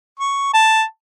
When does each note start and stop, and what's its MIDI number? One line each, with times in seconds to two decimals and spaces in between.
0.20 0.49 85
0.54 0.83 81